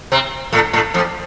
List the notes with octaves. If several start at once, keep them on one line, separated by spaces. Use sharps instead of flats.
C3 C4
A2 A3
A2 A3
F2 F3